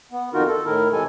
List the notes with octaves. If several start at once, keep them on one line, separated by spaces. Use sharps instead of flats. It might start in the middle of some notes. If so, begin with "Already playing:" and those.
B3
F2 D#3 D#4 F4 F#4 A#4
A4
A2 D#3 E4 A#4
C3 E3 G#3 A4 G#5